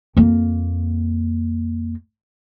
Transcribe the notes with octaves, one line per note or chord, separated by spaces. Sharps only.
F2 A#3